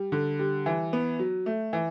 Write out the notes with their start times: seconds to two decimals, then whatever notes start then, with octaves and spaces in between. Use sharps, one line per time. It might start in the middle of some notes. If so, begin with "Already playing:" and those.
Already playing: G3
0.12 D3
0.39 G3
0.66 E3
0.93 B3
1.19 F#3
1.46 A3
1.73 E3